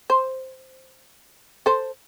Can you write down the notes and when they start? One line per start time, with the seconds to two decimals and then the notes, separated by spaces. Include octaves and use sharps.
0.10 C5
1.66 A4 C5